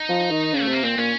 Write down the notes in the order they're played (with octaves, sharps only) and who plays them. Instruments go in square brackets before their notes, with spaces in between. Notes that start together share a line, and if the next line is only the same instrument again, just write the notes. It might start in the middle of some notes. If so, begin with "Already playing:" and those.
Already playing: [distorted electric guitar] D#4
[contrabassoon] F3
D#3
C#3
[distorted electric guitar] A3
[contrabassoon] C3
[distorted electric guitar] A#3
[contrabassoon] A#2 [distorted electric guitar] C4
[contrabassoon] A#2 [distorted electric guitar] C#4